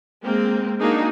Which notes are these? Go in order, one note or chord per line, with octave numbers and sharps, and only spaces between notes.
G#3 A#3 C4
A#3 D4 D#4 F#4 G#4